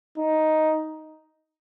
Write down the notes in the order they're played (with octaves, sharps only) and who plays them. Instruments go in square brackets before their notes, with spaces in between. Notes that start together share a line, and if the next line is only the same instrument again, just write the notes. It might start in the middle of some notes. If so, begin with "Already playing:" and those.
[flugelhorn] D#4